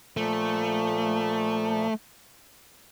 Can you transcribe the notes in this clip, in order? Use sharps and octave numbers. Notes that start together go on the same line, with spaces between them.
A#2 F3 A3